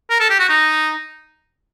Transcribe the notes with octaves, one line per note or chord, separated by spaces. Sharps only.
A#4
A4
G4
F#4
D#4